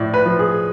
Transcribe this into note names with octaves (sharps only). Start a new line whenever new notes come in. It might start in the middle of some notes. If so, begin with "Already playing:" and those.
Already playing: A2 F3 D5
B4
F3
G#4